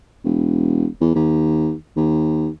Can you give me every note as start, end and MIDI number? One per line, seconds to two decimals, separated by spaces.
0.25 0.87 28
1.01 1.14 40
1.15 1.74 39
1.97 2.49 39